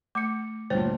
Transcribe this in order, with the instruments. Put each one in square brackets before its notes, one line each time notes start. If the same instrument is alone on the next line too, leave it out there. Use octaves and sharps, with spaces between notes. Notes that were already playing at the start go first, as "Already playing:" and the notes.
[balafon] A3 [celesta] D6 C#7
[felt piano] D2 G2 A#2 [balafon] C5 G5 [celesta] C#5